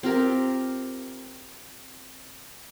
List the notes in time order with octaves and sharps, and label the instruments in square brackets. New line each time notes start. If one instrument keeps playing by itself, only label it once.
[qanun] C4 F4 G4 A#4